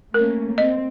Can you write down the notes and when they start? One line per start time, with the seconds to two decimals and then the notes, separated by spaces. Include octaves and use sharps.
0.14 A3 A#3 C#4 A#4
0.58 C4 D#5